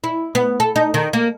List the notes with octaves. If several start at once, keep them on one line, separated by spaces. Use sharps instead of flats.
E4
B3
A4
D#4
D#3
A#3